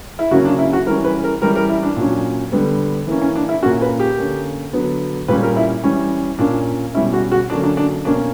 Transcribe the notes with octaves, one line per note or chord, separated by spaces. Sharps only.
E4
C#3 F#3 A#3 C#4 F#4
D4
E4
F#4
E3 G3 C#4 A#4
B4
A#4
E3 G3 C#4 A#4
A#4
E4
D4
A#2 F#3 C#4
D3 G3 B3
E3 A#3 C#4
C#4
D4
E4
A#2 A#3 C#4 F#4
B4
G4
D3 A#3 C#4
D3 F#3 B3
A#2 G3 A#3 C#4 B4
A#4
E4
E3 G3 C#4
A#2 A#3 C#4 D4
B2 G3 C#4 E4
F#4
F#4
D3 F#3 A#3 C#4 D4
D4
D4
B2 A#3 C#4 D4